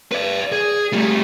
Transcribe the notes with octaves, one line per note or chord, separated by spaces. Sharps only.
B4 D5
G#4
G3 A3